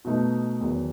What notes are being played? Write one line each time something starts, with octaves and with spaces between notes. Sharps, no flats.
B2 A3 D#4
E2 D#3 F#3